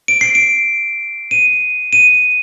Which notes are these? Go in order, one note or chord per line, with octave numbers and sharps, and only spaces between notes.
D7
C7
D7
D#7
D#7